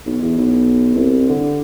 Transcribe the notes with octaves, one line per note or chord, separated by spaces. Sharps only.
B1
E2
B1
C2
D3